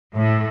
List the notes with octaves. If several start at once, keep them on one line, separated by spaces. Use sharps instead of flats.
A2